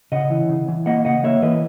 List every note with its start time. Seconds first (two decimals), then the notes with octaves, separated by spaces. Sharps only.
0.12 C#3 D#5 F#5
0.30 E3
0.49 C#3
0.68 E3
0.86 A#3 D#5 F#5
1.05 C#3 D#5 F#5
1.24 A#3 C#5 E5
1.42 E3 B4 D#5